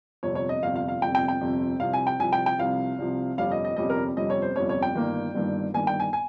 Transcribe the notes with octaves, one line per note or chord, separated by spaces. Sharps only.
G1 F2 C3 C#5
C#5
D#5
G1 F2 C3 F5
F5
F5
G1 F2 C3 G5
G5
G5
G1 F2 C3
C2 C3 F3 F5
G#5
G5
C2 C3 F3 G#5
G5
G5
C2 C3 F3 F5
C2 C3 F3
G1 F2 C3 G3 C#4 F5
D#5
D#5
G1 F2 C3 G3 C#4 D#5
A#4
G1 F2 C3 G3 C#4 D#5
C#5
C5
G1 F2 C3 G3 C#4 C#5
C#5
G5
G1 G2 D#3 A#3
G1 G2 D#3 A#3
G1 G2 D#3 A#3 G#5
G5
G#5
G#5